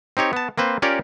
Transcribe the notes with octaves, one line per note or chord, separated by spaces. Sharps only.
C4 D#4 G4 C#5
B3 A5
A#3 C4 B4 C5
C#4 F4 G4 A#4 C#5 D5